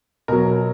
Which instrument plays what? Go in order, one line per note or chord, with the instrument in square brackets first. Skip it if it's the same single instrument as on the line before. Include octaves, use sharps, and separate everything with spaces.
[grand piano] B2 F#3 A#4